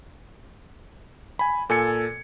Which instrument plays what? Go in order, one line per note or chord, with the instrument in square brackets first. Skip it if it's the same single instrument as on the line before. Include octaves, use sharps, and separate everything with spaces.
[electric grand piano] G#5 B5
A#2 A4 G#5 G#6 C#7